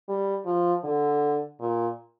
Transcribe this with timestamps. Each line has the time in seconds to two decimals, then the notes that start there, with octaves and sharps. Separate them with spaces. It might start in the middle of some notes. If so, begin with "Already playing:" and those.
0.09 G3
0.46 F3
0.84 D3
1.60 A#2